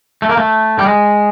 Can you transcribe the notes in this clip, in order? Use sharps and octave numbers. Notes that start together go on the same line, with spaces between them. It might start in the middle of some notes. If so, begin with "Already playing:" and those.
A3
A#3
A3
G3
G#3